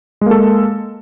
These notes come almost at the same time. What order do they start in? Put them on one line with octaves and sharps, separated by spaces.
G#3 A#3 A4